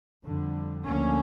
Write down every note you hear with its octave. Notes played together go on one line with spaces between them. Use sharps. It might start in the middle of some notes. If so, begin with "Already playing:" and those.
F2 D3 G3
D2 D3 F3 A#3 C#4